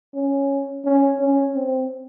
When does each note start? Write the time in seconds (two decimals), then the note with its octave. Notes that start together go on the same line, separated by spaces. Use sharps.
0.14 C#4
0.85 C#4
1.20 C#4
1.55 C4